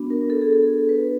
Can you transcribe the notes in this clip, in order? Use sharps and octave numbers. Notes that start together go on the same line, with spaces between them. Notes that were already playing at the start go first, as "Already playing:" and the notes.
Already playing: B3 D4 F#4
A#4
A4
G#4
A4
B4